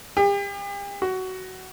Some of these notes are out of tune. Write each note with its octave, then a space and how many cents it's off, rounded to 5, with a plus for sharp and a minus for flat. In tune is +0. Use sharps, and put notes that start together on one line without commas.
G4 +40
F#4 +15